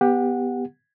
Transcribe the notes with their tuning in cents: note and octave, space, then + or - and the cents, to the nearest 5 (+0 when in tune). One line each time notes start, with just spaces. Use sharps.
B3 +0 G4 +10 F#5 -15